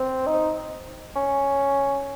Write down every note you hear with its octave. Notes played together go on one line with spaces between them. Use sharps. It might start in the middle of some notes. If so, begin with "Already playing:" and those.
Already playing: C4
D#4
C#4